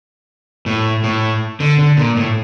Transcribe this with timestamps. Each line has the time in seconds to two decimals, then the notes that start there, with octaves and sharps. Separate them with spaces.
0.66 A2
1.04 A2
1.60 D3
1.78 D3
1.97 A#2
2.17 A2